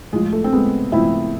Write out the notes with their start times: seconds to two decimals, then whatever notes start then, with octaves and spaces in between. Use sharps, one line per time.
0.13 A2 F3 G#3
0.32 A3
0.44 C4
0.52 G#3 B3
0.92 A2 F3 C4 E4